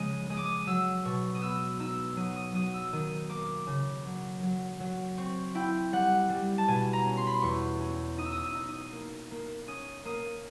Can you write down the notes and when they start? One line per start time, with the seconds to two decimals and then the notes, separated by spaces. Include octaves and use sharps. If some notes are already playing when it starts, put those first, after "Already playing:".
Already playing: C#3 F3 G#3 D#6
0.30 G#3 D#6
0.37 D6
0.45 D#6
0.67 F#3 E6
1.05 B2 C#6
1.35 D#6
1.41 B3 E6
1.80 D#4 E6
2.17 F#3 D#6
2.36 D#6
2.54 F#3 D#6
2.74 E6
2.93 D#3 D#6
3.29 A#3 D6
3.67 C#3
4.05 F#3
4.43 F#3
4.80 F#3
5.17 C4 C#6
5.55 E4 G5
5.93 G3 F#5
6.30 G3
6.58 A5
6.68 B2 G#5
6.93 A#5
7.05 C#4
7.17 C6
7.27 B5
7.34 C6
7.42 E2 C#6
7.80 C#4
8.18 D#4 D#6
8.25 E6
8.32 D#6
8.43 E6
8.55 D#4
8.69 D#6
8.92 A#3
9.31 A#3
9.68 C#4 D#6
10.05 A#3 D#6